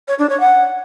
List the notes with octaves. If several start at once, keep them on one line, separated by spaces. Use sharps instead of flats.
C#5
D4
C#5
F#5